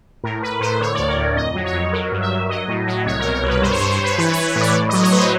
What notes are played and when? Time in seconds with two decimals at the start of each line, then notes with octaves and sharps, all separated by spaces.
0.24 A2 A#4
0.42 A2 B4
0.61 A2 C5
0.80 D3 C#5
0.94 D2 D5
1.08 A#4
1.18 D2
1.36 F2 D#5
1.55 F#3
1.65 C#5
1.73 F2
1.93 F#3 A#4
2.12 G2
2.21 E5
2.30 G2
2.49 F#3 D#5
2.68 A2
2.87 F#3
3.06 C2 C#5
3.19 B2 A#4
3.33 A#4
3.43 C2
3.48 B4
3.62 G2 C5
3.71 C#5
3.76 G2 C5
3.90 C#5
3.99 G2 B4
4.18 E3 B4
4.32 C#5
4.37 E3
4.47 C#5
4.56 A2
4.61 D5
4.74 A2
4.89 F#3 D#5
5.03 C#5
5.12 F#3 B4
5.18 C5